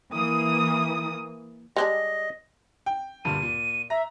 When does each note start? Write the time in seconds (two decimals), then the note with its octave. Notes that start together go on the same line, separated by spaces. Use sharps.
0.13 E3 A#3 D#6
1.76 G3 G#3 D4 D#5
2.86 G5
3.25 D2 G2 A#2 D#7
3.42 A#2
3.90 E5 A#5 A#6